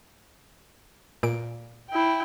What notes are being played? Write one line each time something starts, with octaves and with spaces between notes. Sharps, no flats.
A#2 D7
E4 G5